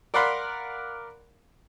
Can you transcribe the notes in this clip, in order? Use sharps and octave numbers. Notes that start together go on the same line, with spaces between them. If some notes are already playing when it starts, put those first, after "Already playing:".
A#4 D5 F5 F#5 B5 C6